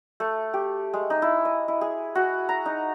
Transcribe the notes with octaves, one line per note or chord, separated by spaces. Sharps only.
A3
G4
G#3
D#4
E4
D#5
E4
G#4
F#4
A#5
D#4